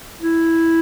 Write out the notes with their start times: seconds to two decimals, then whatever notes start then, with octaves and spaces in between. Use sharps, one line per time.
0.22 E4